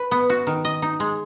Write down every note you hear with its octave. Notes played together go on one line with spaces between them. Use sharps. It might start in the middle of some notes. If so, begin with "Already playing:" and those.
Already playing: B4
B3
F#4
D#3
D#5
D#4
G#3